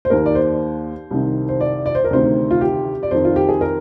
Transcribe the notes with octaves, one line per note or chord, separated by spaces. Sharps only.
C5
D#2 D#3 A#4
D5
C5
C2 C3 D#3
C5
D5
D5
C5
A#4
D2 C3 D#3 C5
F4
G4
D5
F2 D#3 C5
F4
G4
G#4
A#4